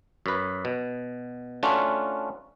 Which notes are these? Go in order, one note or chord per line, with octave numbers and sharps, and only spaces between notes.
F#2 B4
B2
A3 C#4 D4 F4 F#4